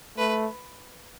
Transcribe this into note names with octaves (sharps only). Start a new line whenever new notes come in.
A3 B4